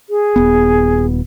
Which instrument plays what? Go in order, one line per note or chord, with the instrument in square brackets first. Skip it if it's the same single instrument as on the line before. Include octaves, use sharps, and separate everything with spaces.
[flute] G#4
[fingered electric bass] D#1 B3